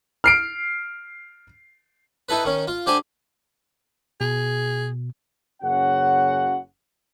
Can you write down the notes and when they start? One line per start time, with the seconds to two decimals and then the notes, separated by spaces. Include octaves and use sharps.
0.24 F6 C7 D7
2.29 D#4 E4 A4 B4
2.45 D#3 C#4
2.67 F4
2.86 D3 G4 C5 G#5
4.21 B2 G#4
5.63 F#1 C#3 C#4 F#4 F#5